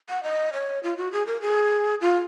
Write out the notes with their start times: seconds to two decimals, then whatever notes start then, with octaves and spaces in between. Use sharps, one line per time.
0.09 F#5
0.23 D#5
0.53 C#5
0.83 F4
0.97 F#4
1.12 G#4
1.27 A#4
1.42 G#4
2.01 F4